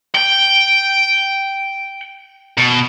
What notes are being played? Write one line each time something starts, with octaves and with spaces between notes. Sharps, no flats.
G5
B2